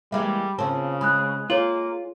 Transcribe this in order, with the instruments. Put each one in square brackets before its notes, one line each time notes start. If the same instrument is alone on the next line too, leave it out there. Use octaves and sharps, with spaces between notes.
[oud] E3 G#3 A#3 [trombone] G3 [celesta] E5
[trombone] C#3 [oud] F3 A#3 C4 [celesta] A5
[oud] G#3 [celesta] B5 D#6 F#6
[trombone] A#3 [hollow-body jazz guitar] F4 [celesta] A4 C#5 F#7